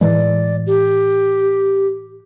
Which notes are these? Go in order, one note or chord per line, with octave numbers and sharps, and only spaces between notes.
A2 E3 G#3 D5
G4